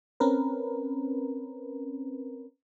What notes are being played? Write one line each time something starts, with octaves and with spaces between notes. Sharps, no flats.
C4 C#4 A#4 B4